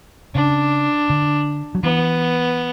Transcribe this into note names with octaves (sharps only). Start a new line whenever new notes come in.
C#3 D4
D3
F#3
E3 B3